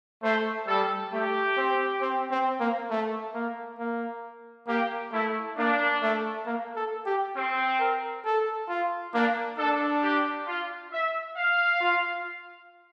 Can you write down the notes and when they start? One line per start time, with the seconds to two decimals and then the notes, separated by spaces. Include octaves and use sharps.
0.23 A3 C5
0.67 G3 A4
1.12 A3 G4
1.57 C4
2.01 C4
2.31 C4
2.60 A#3
2.90 A3
3.34 A#3
3.79 A#3
4.68 A#3 G4
5.12 A3 E4
5.57 A#3 D4
6.02 A3
6.46 A#3
6.76 A4
7.06 G4
7.36 C4
7.80 A#4
8.25 A4
8.69 F4
9.14 A#3 D4
9.58 D4 A4
10.02 G4
10.47 F4
10.92 E5
11.36 F5
11.80 F4